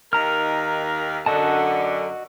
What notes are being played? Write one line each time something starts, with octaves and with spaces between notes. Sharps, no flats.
D#2 D#3 D#4 A#4 A#5 F6
F#2 D3 F#4 D#5 A5